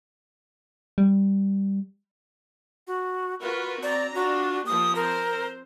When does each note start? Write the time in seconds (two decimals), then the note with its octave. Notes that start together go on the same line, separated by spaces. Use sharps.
0.98 G3
2.87 F#4
3.41 F4 F#4 A#4 B4
3.83 C4 D5 A#5
4.15 D4 F4 F#4
4.66 F3 A#3 G4 D#6
4.95 C4 A#4 C5